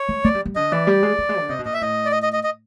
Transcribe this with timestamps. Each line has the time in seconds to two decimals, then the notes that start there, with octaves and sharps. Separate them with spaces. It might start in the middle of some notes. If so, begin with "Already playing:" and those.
Already playing: C#5
0.09 G#3
0.24 G#3 D5
0.35 G3
0.45 G3
0.56 D3 D#5
0.72 E3 D5
0.87 G3
1.03 G#3
1.18 G3
1.29 G#3
1.39 D3
1.49 C3 D#5
1.59 B2
1.65 A#2 D#5
1.74 E5
1.81 A2 D#5
2.05 D5
2.12 D#5
2.23 D#5
2.33 D#5
2.44 D#5